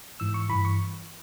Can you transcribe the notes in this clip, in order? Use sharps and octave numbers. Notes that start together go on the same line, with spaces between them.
G#2 E3 E6
C#6
G2 E3 B5
C#6